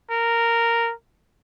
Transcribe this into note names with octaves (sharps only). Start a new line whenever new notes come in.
A#4